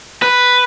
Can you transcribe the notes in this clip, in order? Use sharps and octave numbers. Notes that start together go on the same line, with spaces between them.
B4